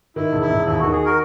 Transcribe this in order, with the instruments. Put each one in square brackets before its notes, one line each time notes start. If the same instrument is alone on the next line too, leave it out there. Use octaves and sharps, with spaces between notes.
[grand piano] D#3 [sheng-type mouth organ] E4
[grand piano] E1
[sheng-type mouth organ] E4
[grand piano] E1
[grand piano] D#2 [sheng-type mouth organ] E4
[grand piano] D#3 [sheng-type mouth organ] F#4
[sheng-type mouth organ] G#4
F#4 A#4